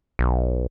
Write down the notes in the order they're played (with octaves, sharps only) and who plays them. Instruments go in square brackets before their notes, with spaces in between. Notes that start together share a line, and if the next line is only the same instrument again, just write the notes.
[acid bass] B1